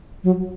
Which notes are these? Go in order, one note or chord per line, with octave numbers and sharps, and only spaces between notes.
F#3